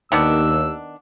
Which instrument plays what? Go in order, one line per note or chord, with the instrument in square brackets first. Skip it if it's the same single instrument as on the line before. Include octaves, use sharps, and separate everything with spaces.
[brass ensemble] D#2 [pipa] D#3 B3 D4 [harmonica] E6